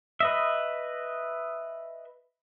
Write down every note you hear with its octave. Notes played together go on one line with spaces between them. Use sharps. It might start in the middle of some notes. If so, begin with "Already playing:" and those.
B4 D#5 E5